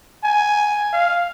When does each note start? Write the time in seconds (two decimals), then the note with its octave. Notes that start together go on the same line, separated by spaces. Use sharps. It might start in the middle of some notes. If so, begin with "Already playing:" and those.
0.24 G#5
0.93 F5